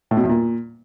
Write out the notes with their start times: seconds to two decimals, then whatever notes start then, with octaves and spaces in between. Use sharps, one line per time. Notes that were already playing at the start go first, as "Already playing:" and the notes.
0.11 A2
0.17 B2
0.23 E2
0.29 A#2